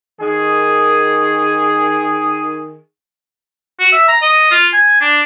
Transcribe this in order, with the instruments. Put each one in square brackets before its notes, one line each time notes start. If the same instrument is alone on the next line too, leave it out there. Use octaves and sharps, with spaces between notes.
[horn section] D#3 G#4
[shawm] F#4
E5
A#5
D#5
F4
G#5
D4